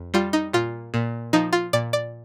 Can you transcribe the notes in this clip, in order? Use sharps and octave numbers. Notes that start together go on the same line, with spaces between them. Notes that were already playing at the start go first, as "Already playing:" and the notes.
Already playing: F2
G3 F4
D#4
A#2 F4
A#2
F3 D#4
F4
A#2 D5
D5